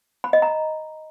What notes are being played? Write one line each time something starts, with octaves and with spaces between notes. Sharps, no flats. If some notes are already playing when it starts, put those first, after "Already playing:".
B5
D#5
A#5